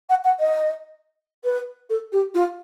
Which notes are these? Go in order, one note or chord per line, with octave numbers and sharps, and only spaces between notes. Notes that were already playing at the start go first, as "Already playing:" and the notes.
F#5
F#5
D#5
B4
A4
G4
F4